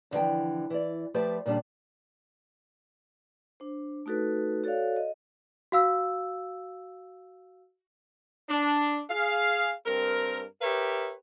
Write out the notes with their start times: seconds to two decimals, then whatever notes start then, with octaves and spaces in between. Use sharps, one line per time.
0.11 F2 D3 E3 F3 G5
0.70 E3 D5
1.14 F3 A3 G4 B4 C5 D5
1.46 A#2 C#3 G3 D4 F4
3.60 D4 C5
4.06 A3 D#4 F#4 A4 B4
4.64 F#4 A4 C#5 D5 F5
4.96 D#5
5.72 F#4 F5 E6
8.50 D4
9.11 G#4 F5
9.86 G2 C4 A#4
10.62 G4 A#4 B4 C#5 E5